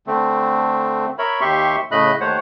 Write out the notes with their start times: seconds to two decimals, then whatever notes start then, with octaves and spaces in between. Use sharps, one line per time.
0.07 D3 A3 C4
1.18 A#4 C#5 E5 B5
1.41 D#2 G4 E5 C6 C#6
1.91 A2 C#3 A3 D#5 B5 F#6
2.20 D#2 A3 C5 C#5 F#5